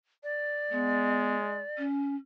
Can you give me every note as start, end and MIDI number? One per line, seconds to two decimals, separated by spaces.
0.23 1.85 74
0.71 1.63 56
0.71 1.35 59
1.77 2.15 61